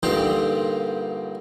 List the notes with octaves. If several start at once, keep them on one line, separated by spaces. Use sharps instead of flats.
G2 A#2 D3 C4 D#4 G4